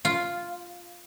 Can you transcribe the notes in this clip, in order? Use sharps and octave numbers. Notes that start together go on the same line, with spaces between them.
F4